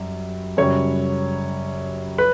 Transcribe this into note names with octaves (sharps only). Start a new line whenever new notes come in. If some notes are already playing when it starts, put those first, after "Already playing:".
Already playing: F#2 G3
F#2 C#3 G3 C#5
B4